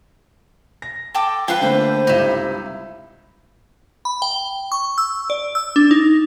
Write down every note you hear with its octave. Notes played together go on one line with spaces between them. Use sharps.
A#6
A4 G5 D6
F3 B4 F5 G5
D3 A3 A#3 C5
C#2 G2 C3 D#4 E4
B5
G5
C#6
E6
D5
E6
D4
D#4